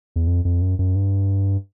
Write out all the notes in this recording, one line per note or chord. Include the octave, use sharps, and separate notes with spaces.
E2
F2
F2
F#2
F#2
G2